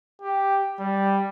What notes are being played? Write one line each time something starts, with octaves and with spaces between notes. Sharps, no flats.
G4
G3